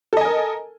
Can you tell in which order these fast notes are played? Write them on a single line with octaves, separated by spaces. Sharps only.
A4 D#5 G#5 A#4